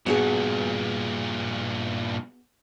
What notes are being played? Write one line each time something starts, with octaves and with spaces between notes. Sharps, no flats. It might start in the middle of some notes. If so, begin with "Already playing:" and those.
G2 A#2 B3 F#4 G#4